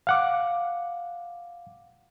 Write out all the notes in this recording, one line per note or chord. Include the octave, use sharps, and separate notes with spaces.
F5 F#5 D6